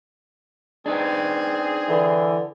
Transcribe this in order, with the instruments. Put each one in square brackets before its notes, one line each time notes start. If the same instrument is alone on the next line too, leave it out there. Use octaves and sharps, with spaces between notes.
[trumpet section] C4 G#4 [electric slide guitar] D4 D#4 B4
[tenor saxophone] D3 [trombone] E3